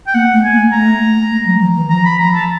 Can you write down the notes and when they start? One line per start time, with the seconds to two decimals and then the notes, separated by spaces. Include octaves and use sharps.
0.07 G5
0.14 A#3 F#5
0.34 A3
0.44 G#5
0.53 A#3
0.73 A3 A#5
1.32 A3
1.46 F#3
1.61 F3
1.76 E3
1.90 F3 A#5
2.05 B5
2.19 F3 A#5
2.34 A5